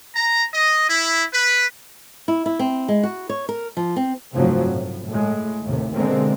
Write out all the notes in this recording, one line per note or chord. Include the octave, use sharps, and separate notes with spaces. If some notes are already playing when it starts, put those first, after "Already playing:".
A#5
D#5
E4
B4
E4
E4
C4
G#3
F#4
C#5
A#4
F3
C4
F1 G2 C#3 F3 F#3 C4
A2
A2 G#3
D#2 A2 C3
B2 D3 G#3 A#3 C4